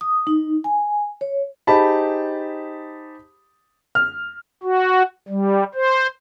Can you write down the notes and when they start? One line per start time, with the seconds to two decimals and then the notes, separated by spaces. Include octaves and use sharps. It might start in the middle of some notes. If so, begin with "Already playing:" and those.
0.01 D#6
0.27 D#4
0.64 G#5
1.21 C#5
1.67 D#4 G4 G#4 C5 A5 B5
3.95 F6
4.63 F#4
5.28 G3
5.75 C5